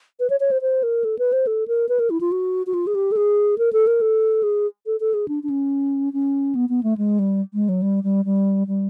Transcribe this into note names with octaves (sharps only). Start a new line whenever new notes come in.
B4
C#5
C#5
C5
C5
A#4
A4
B4
C5
A4
A#4
B4
A#4
E4
F4
F#4
F#4
F4
G#4
G4
A4
G#4
A#4
A4
A#4
A4
G#4
A4
A4
G#4
D4
D4
C#4
C#4
B3
B3
A3
G#3
G3
G#3
F#3
G3
G3
G3
G3